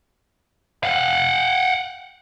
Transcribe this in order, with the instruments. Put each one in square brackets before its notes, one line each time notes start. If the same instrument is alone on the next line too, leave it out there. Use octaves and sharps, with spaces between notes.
[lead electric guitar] F5 F#5